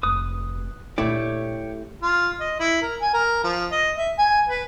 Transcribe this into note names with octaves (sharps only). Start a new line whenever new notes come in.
F1 B4 D#6
A#2 D3 A3 E4 G4 C#5 D5 G5
F4
D#5
E4
A#4
G#5
A#4
F3
D#5
E5
G#5
B4